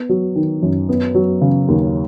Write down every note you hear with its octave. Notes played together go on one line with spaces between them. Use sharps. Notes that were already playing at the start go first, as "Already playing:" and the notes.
Already playing: B3
F#3
D#3
F#2
B3
F#3
C#3
D#2